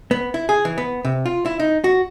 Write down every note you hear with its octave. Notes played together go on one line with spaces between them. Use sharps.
B3
E4
G#4
E3
B3
C3
F4
E4
D#4
F#4